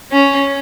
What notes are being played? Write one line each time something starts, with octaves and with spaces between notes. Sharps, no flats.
C#4